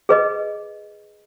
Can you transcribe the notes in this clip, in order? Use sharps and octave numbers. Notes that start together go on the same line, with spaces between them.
G#4 B4 D#5